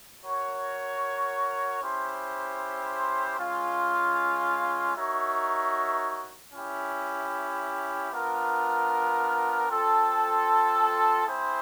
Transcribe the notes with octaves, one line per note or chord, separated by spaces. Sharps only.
F#4 A#4 C#5
C#4 E4 G4 C5
G#3 C#4 F4
D#4 F#4 A#4 C#5 E5
C#4 E4 G4
B3 D4 F4 A#4
C4 F4 A4
C4 E4 G#4 C5